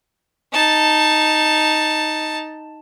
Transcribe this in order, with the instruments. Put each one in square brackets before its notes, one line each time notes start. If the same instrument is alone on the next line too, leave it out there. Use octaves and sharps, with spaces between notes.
[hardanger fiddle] D#4 A5